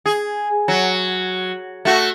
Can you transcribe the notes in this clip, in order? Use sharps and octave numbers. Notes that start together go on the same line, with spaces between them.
G#4
F#3
A3 F#4